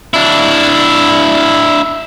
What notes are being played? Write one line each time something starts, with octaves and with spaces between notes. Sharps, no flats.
D4 E4